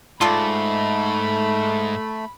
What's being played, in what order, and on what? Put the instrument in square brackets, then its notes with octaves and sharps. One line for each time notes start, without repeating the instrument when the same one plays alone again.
[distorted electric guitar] G#2 [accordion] A3 [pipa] F4 A4 D5 [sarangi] B5